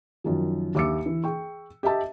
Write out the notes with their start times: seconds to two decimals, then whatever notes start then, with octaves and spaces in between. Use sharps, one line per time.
0.24 F#2 D#3 F3
0.75 D#2 E5 D6 E6 C#7
1.06 E3
1.24 G#4 G5 C#6
1.83 G4 D#5 E5 A5